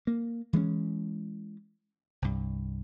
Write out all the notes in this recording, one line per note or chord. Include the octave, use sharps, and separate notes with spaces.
A#3
E3 G#3 A3 C#4
C2 G2